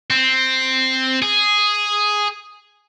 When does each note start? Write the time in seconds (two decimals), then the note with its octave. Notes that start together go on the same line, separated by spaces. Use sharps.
0.11 C4
1.22 G#4